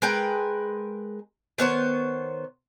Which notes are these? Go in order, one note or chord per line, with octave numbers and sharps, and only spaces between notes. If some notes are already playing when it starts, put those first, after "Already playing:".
G#3 A#4 B4 G5
D#3 B3 C5 C#5